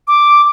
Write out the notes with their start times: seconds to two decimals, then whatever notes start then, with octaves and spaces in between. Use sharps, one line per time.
0.08 D6